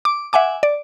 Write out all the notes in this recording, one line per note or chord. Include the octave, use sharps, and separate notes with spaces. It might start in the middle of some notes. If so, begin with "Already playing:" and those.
D6
E5 F#5 G#5 D6
D5